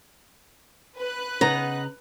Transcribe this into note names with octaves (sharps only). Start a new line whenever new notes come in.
B4 F#6
C#3 B3 D#4 A#5